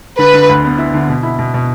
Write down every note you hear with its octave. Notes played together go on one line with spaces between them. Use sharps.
D3 B4
D3
D2
B3
E4
D3
B2
E4
B2
B2